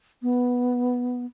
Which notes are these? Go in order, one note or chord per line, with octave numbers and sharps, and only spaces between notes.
B3